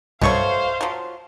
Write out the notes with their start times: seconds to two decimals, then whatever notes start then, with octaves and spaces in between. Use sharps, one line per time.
0.21 B1 G2 B2 A3 C5 C#5 F5 C#6
0.81 F3 F#3